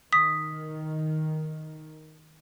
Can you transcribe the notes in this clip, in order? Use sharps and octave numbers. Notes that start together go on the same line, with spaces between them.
D#3 D#6 B6